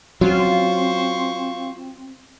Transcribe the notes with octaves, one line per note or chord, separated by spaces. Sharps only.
F#3 C4 C#4 F4 C5 C#6